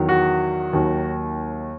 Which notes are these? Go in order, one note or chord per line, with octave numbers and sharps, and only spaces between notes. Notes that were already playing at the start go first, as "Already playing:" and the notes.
Already playing: E2 D#3 F#3
F#4
D#2 D#3 F#3